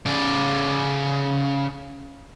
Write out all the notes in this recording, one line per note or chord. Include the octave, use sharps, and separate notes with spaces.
C#3 D5